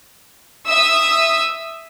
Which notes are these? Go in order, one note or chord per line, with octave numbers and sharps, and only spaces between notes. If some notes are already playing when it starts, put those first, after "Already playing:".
E5 D#6 E6